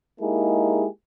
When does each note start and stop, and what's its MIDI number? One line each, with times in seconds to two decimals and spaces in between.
0.21 0.87 56
0.21 0.87 58
0.21 0.87 63
0.21 0.87 64
0.21 0.87 67
0.21 0.87 68